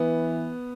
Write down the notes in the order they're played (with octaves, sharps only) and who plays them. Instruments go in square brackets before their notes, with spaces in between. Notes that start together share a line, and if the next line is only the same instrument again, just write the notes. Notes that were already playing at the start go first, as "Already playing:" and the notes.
Already playing: [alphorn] E3 [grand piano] B3